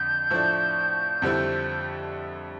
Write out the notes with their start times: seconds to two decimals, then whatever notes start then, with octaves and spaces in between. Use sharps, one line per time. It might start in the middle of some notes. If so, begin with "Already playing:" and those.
Already playing: F2 D3 G6
0.30 A2 F3 A3 D4
1.22 F2 D3 G3 C4 E4